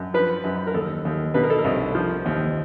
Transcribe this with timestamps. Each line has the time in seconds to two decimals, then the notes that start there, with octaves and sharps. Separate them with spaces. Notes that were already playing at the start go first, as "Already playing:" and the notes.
Already playing: F#2
0.14 F3 B4
0.44 F#2
0.67 A#4
0.74 D#2 A4
1.05 D#2
1.34 B2 B4
1.43 A#4
1.50 A4
1.58 A#4
1.64 C2
1.95 F3
2.26 D#2